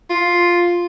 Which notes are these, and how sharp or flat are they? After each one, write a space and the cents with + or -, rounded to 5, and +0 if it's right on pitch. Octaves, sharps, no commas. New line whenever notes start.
F4 +0